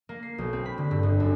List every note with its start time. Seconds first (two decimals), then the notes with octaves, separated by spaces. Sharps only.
0.09 A#3
0.23 C7
0.38 B1
0.53 C4
0.66 B5
0.78 D3
0.91 G2
1.03 G1
1.20 F#2